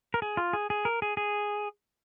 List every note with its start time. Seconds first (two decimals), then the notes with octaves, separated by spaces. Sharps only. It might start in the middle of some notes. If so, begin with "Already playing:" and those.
0.14 A#4
0.22 G#4
0.37 F4
0.53 G#4
0.70 G#4
0.85 A#4
1.02 G#4
1.17 G#4